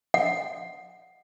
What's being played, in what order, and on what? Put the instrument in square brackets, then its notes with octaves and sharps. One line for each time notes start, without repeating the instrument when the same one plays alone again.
[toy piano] F#5